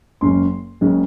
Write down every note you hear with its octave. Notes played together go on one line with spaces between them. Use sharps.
F#1 F#2 C#3 G#3 C#4 C6
F#1 F#2 C#3 G#3 C#4